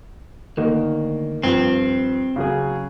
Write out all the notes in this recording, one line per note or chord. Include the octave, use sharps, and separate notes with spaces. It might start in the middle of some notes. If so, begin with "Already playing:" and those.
D2 D#3 A#3
G2 F3 C4
C#3 F#3 G#4